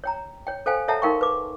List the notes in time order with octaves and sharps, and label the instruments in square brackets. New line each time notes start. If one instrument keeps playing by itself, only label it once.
[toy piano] C#5 G5 A#5
C#5 G5
A4 C5 F5 G5 G#5
A4 C#5 E5 F#5 A5 A#5
D#4 A#4 F5 G5 C6 C#6
B4 D6